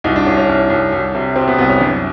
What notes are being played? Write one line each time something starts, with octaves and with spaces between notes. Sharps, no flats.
C2 D#4
D4
C2 C#4
C#4
C2
C2
C2
C3
C3 C4
B3
C2 B3
C#4
F#2 D4